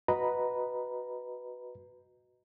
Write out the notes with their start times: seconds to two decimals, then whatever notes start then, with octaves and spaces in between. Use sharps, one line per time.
0.08 F#4 B4 D#5 A#5 B5